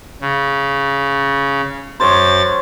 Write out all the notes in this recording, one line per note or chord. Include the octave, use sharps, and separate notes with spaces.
C#3
F#2 C5 C#5 A6